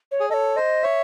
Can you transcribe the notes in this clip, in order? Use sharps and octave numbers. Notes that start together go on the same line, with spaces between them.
C#5
G#4
A4 C#5 D#5
C5 D#5
C#5 E5